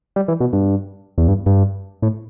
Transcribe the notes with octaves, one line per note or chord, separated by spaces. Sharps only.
G3
E3
B2
G2
E2
G2
G2
A2